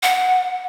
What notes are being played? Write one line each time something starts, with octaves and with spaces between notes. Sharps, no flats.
F#5